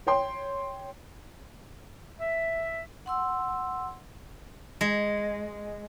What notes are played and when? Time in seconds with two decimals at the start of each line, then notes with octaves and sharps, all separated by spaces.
0.07 C#5 G5 C6
2.20 E5
3.06 F#5 C6 E6
4.81 G#3